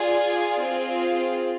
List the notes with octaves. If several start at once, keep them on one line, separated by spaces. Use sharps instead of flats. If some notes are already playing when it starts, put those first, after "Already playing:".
Already playing: F4 G#4 D5 G#5
C4 F4 G#4